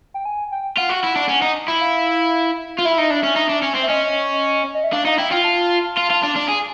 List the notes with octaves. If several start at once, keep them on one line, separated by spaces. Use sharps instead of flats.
G5
G#5
G5
F4 F#5
F#4
E4
D4
C#4
D#4
E4
F5
F4
E4 E5
D#4
D4
C#4
D#4
D4
C#4
C4
E5
C#4 D#5
D#5
E5
D4 F5
D#4 F5
E4 G5
F4 G5
A5
F4
F4
D4
D4
A5
G#4 G#5